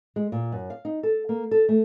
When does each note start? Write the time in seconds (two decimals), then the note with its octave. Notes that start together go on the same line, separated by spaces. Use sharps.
0.16 G#3
0.32 A#2
0.52 F#2
0.70 F5
0.85 D#4
1.03 A4
1.29 A#3
1.51 A4
1.69 A3